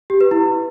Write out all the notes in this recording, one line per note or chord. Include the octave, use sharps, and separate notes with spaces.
G4
B4
E4